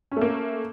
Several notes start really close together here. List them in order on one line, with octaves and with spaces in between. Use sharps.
C#4 A3 A#3